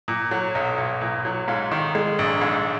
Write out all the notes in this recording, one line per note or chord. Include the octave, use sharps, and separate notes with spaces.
A#2
F#3
B1
B1
A#2
F#3
G#2 F4
D#3
G#3
A#1
G#2